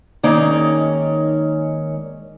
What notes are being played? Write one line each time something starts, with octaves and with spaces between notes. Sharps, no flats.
D#3 G#3 A#3 C#4 D#4 D5